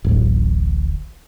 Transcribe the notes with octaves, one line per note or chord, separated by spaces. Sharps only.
D1 A1